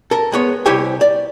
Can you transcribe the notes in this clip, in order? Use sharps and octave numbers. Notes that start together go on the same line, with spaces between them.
A4 A#4
G#3 B3 C#5
C2 E4 G4 C5 C#5 G#5
D5